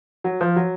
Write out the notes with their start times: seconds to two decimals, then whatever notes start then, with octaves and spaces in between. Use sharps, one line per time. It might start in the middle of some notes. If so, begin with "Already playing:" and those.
0.24 F#3
0.41 F3
0.56 F#3